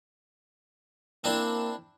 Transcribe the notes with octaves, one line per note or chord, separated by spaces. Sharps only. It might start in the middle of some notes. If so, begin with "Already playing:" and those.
A#3 C4 D4 E4